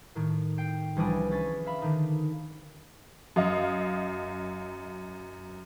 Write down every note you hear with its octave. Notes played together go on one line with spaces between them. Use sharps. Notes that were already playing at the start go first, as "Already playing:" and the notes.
A2 D#3
G5 C7
C2 E3 F3 D4 G#5 D#6
C#4 G#4 A6 B6
E5 F5 B5
D3 D#3 D#4
F#2 D#5 F5 D#6